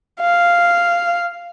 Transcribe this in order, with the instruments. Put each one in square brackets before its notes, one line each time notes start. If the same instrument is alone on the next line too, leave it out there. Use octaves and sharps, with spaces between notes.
[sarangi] F5